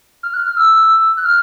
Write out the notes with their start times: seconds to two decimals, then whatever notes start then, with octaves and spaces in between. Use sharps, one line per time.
0.23 F6
0.34 F#6
0.45 F6
0.57 E6
1.17 F#6
1.25 F6